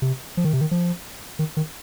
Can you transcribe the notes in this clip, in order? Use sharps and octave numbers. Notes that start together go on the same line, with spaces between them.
C3
F3
D#3
C3
D#3
F3
D#3
D#3